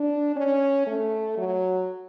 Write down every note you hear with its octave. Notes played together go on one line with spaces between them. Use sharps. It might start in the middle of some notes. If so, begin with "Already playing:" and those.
Already playing: D4
C#4
A3
F#3